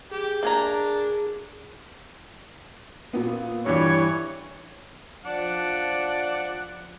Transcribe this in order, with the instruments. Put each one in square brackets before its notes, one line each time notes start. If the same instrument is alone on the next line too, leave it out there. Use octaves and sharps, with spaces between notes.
[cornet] G4 [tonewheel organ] G#4
[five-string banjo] A#3 G#5 A#5 [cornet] D4
[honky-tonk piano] A#2 B3
[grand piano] G2 E3 [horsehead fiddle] C#5
[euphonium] F3 [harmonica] D4 D5 F#5